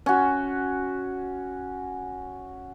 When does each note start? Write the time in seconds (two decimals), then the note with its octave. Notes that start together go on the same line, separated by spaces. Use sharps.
0.06 C#4 F#4